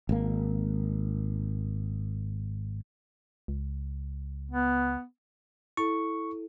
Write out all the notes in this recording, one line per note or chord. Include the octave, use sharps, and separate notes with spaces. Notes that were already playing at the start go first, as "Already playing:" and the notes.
G#1 A#3
C#2
B3
E4 A4 C#6